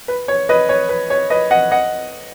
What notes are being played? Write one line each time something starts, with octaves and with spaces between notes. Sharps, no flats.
B4
C#5
B4 D#5
C#5
B4
C#5
B4 D#5
D#5 F#5
D#5 F#5